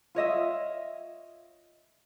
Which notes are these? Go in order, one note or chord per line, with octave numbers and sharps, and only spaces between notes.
F4 C#5 D#5 E5